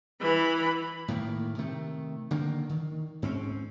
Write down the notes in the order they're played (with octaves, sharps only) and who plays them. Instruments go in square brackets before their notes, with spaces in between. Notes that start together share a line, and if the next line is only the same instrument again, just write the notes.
[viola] E3 B5
[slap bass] A2 D#3 A#3
C3 D#3 A3
D3 D#3 A#3
D#3
G#2 C4 C#4